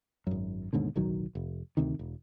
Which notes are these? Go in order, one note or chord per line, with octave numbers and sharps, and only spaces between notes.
G#1 F#2
D#2 G#2 B2 D3
D1 B1 D#3 F#3
F1
D2 C3 D#3
E1